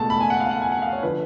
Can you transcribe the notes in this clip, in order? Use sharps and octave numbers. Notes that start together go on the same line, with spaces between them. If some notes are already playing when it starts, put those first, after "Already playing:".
Already playing: C#2 B2 A3 A5
B5
G#5
F#5
F5
F#5
G#5
F#5
F5
C#5
D3 F3 B4